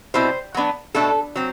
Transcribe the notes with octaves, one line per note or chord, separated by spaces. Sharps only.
B2 G3 C4 E4 C5
F#3 B3 D4
B2 A3 D4 A4
F#3 C4